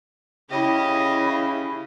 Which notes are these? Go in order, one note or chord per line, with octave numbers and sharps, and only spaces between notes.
C#3 E4 G4 D#5